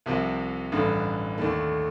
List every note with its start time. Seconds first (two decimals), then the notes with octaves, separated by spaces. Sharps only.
0.06 C2 C3 F3 C4
0.72 A1 G2 D3
1.38 D#2 D3 A3